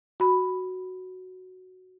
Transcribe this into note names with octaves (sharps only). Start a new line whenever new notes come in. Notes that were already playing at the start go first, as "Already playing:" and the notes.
F#4 B5